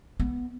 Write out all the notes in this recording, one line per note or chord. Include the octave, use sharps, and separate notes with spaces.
B3